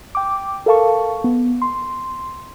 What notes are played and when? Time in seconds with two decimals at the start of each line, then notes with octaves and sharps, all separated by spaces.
0.15 G5 D6
0.66 A4 A#4 F5 A5 C#6
1.24 B3
1.62 C6